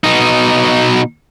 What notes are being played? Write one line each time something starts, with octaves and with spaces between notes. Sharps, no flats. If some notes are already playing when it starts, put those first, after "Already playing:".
B2 D#4